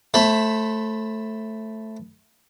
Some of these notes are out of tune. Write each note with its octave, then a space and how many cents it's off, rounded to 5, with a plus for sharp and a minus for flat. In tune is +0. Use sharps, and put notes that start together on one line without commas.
A3 +0 C5 +35 B5 +0